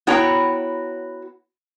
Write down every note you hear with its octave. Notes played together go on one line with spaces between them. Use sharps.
B3 E4 F#4 C#5 G5 A#5